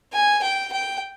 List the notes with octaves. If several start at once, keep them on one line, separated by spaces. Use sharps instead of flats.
G#5
G5
G5